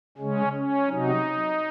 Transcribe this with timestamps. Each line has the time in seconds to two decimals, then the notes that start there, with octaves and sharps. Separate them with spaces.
0.18 C#3 G#3 C#4
0.53 C#4
0.87 C3 F#3 D#4